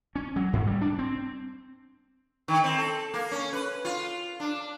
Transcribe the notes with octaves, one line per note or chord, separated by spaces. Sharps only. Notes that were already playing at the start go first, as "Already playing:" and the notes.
C#4
F#3
G#2
G3
D4
C4
D#3
C4
A4
A#3
C#4
B4
F4
D4